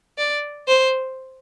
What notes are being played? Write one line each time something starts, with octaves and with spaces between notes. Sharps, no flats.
D5
C5